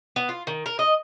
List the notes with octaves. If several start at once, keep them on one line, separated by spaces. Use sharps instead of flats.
B3
F4
D#3
A#4
D#5